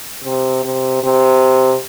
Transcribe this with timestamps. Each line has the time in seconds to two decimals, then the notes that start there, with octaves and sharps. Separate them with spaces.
0.24 C3
0.64 C3
1.03 C3